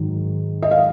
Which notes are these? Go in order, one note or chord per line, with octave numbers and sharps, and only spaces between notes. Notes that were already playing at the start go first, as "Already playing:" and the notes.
Already playing: G#2 D#3 F#3
D#5
F5